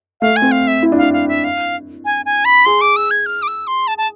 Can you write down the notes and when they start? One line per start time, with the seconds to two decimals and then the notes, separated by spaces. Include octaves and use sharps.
0.21 A3 F5
0.36 G#5
0.42 C4
0.52 F5
0.68 E5
0.83 E4
0.92 D4
0.97 E4 F5
1.13 F5
1.28 E5
1.44 F5
2.05 G#5
2.26 G#5
2.45 B5
2.65 G#4 C6
2.81 D6
2.96 E6
3.11 G#6
3.26 F6
3.43 D6
3.48 E6
3.67 C6
3.87 A5
3.98 A5